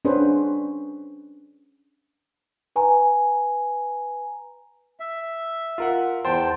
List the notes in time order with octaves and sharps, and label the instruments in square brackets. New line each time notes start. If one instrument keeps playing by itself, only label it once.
[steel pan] C#4 D4 G#4 B4 C5
[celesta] B4 G#5 A#5
[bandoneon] E5
[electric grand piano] F4 A#4 F#5
[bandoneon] E2 G5 A5 [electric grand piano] C5 C6